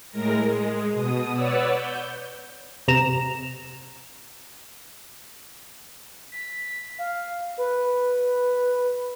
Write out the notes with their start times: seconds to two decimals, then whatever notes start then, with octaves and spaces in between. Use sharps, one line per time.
0.11 A2 G#3 A#4 A#6
0.44 G#3
0.93 B2 D#6
1.33 B4 C#5 D5 F#5 E6
1.73 G6
2.88 C3 A#5 E7
6.32 B6
6.99 F5
7.58 B4